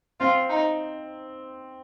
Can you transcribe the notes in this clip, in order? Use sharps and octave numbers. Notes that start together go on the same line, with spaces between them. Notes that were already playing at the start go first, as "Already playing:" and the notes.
C4 F4
D#4